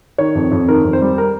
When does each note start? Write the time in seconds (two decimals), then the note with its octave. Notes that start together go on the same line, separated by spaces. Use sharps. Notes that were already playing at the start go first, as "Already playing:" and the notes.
0.18 D#3 C#5
0.35 F2
0.52 F2
0.68 D#3 A#4
0.85 F2
0.93 C5
1.01 G3
1.18 A#4